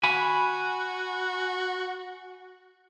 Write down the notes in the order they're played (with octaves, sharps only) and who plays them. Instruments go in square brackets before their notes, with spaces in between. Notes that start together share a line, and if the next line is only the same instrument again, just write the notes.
[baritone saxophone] F#4 [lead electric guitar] G#5 B5